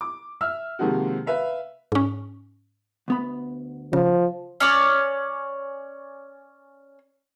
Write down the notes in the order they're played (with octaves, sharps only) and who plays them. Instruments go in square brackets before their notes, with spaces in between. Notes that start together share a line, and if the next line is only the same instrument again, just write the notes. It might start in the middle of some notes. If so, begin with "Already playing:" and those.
[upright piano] D6
E5 E6 F6
C3 D#3 F3 G#3 A#3 F#4
B4 E5 F5
[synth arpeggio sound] G#2 C#4
[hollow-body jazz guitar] D2 B3 B5
[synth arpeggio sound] C#3 [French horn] F3
[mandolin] C#4 C#5 D5